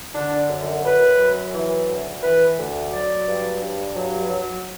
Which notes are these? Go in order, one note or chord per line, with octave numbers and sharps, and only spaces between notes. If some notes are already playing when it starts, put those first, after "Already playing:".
D3 D4
F#2
F#2 B4
F#3
E3
D2
E3 B4
D2
F#3 D5
G2
G2
F#3
F#3